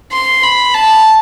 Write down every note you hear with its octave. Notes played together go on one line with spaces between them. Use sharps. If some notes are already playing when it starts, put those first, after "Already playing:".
C6
B5
A5